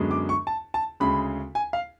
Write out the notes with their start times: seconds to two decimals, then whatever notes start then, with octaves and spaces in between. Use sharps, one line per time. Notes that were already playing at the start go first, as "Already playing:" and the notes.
Already playing: F#2 D3 G#3 B3
0.11 D6
0.29 C#6
0.47 A5
0.74 A5
1.00 D2 C#3 G#3 B5
1.55 G#5
1.73 F5